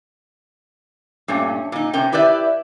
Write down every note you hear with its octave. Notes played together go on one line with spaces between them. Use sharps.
G2 A#2 A3 C#4
A#2 D#4
C3 C#4 A#4 G5
E4 G4 B4 D5 E5